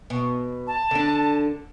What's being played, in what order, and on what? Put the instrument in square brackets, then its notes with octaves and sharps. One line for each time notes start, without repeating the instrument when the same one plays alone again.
[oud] B2
[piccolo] A5
[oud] D3 D4